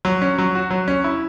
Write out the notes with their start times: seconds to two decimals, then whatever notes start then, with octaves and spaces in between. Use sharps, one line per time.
0.05 F#3
0.22 C#4
0.39 F#3
0.55 F#4
0.71 F#3
0.88 C#4
1.04 E4